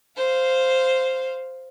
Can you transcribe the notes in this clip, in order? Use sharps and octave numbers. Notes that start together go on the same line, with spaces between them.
C5 F5